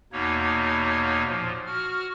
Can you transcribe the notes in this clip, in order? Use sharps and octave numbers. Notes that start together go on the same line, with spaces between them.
E2 B2 A#3 D#4 C#5
A#2 F3
F#4 F6